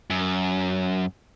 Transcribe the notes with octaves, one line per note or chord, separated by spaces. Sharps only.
F#2